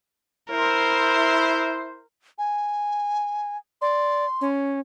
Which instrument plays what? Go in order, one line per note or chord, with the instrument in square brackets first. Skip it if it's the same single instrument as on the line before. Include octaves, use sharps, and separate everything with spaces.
[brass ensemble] E4 C5 [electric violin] A#4
[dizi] G#5
[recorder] D5 [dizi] C6
[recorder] C#4